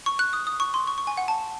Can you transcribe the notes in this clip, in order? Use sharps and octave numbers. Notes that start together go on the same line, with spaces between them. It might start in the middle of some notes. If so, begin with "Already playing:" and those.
C#6
F#6
D#6
D#6
C#6
C6
C#6
C#6
G#5
F#5
A5